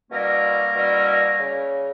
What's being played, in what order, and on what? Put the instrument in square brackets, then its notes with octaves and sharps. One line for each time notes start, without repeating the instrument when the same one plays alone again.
[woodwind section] B2 G3 A#3 C#4 E4 A#4
B2 G3 C#4 E4
C#3